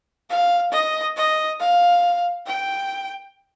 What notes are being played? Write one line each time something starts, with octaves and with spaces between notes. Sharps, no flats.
F5
D#5
D#5
F5
G5